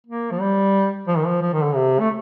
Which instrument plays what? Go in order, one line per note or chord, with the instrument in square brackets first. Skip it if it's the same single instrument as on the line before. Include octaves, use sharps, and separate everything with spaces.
[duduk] A#3
F3
G3
F3
D#3
F3
F3
D#3
D3
C3
A3